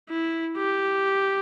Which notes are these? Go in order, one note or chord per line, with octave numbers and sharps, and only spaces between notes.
E4
G4